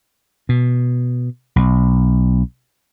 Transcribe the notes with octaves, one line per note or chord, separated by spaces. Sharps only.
B2
B1